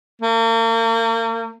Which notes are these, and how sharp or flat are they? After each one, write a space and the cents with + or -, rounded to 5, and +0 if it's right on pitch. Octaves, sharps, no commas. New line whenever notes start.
A#3 -40